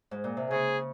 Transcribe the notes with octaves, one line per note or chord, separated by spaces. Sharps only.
G#2
A#2
C3
C#3 G#4